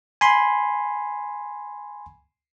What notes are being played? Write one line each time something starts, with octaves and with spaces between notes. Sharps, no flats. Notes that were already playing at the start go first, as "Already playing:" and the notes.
G#5 B5 C6